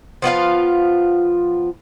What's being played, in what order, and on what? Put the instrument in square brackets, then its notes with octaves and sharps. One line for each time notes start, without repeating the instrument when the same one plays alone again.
[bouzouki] F3 B3 F4 F5